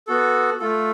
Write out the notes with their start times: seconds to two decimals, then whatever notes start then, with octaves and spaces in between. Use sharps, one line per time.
0.07 B3 F#4 A4
0.60 A3 F4 A4